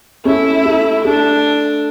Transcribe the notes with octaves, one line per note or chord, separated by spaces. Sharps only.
A3 C#4 E4
A3
A3 D4